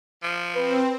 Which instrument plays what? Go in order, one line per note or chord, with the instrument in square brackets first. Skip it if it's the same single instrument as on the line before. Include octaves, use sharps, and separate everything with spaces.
[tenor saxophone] F3
[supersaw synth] C4 [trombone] B4